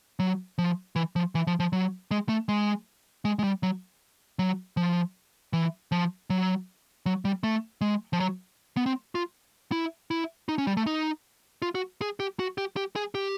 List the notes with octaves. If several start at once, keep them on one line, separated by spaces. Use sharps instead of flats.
F#3
F3
E3
F3
E3
F3
F3
F#3
G#3
A3
G#3
G#3
G#3
G3
F#3
F#3
F3
E3
F3
F#3
F#3
G3
A3
G#3
F3
F#3
B3
C4
F4
E4
E4
D#4
C#4
G3
A3
D#4
F4
F#4
G#4
G4
F#4
G4
G4
G#4
G4